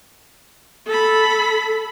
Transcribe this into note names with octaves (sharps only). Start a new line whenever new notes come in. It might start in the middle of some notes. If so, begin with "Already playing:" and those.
A4 B5